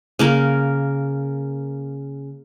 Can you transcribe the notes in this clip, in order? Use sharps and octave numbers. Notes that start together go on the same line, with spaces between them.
C#3 A#3 A#4